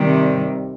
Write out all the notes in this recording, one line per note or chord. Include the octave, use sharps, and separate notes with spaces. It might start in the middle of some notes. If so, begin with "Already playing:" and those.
Already playing: C3 D#3 G3